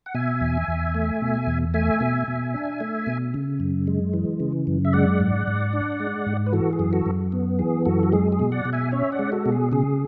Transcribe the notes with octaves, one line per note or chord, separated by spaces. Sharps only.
F#5
B2 E5 G#5
E2
E2
A3
B2
E2
A3 E5 G#5
B2
B2
D4
A3
B2
C#3
F#2
G#3
E3
C#3
F#2
E5
G#3 D5 F#5
G#2
G#2
D4
G#3
G#2
B4
E3 F#4 A4
G#4
F#2
F#4 A4
F#2
B3
E3 G#4
F#2 F#4 A4
F#4
G#3 G#4
G#4
B2
D5 F#5
B2
E5 G#5
C#4 C#5 E5
D5 F#5
G#3
F#4 A4
B2
G#4
C#3 G#4